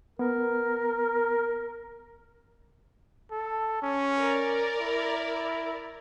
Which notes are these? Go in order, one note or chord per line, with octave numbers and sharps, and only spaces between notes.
B3 A#4
A4
C#4
A#4 D5
E4